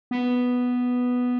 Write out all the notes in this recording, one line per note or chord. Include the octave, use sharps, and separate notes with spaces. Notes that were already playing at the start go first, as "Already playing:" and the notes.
B3